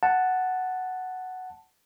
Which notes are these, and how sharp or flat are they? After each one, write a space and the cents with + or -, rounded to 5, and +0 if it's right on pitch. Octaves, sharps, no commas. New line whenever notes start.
F#5 +0 A5 +0